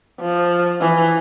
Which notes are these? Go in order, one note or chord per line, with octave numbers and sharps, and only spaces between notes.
F3
E3